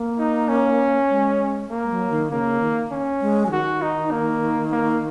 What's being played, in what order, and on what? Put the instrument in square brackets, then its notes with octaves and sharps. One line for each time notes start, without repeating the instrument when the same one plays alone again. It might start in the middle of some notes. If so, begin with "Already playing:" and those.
Already playing: [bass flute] A#3
[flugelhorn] D#4
C#4
[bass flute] G#3
[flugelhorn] A#3
[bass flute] G#3
F#3
D#3
[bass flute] C#3 [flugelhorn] A#3
[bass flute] D#3
[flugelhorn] C#4
[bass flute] G#3
F#3
[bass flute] D#3 [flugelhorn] F#4
[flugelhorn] D#4
A#3
A#3